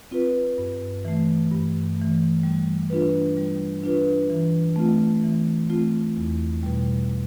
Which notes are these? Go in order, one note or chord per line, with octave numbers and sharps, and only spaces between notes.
C4 F4 B4
G2
E3 A3
G2
E3 A3
G3
D4 F4 B4
G3
D4 F4 B4
E3
A3 C4 F4
E3
A3 C4 F4
E2
B2 G3